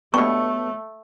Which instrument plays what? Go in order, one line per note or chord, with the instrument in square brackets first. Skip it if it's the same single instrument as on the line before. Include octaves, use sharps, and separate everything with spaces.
[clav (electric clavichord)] G2 B2 [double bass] A3 [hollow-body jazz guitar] B3 C#5 [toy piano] C#6